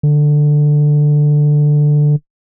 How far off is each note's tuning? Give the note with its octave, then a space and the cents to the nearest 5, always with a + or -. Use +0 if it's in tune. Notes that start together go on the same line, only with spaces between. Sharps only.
D3 +10